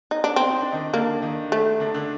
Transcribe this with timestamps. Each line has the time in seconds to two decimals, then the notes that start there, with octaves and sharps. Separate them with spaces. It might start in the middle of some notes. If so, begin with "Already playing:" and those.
0.11 D#4
0.24 D4
0.36 C4
0.49 D#4
0.61 D4
0.72 D#3 D#4
0.93 D3 A#3 D4
1.22 D#3 D#4
1.52 A3
1.80 D3 D4
1.94 D3 D4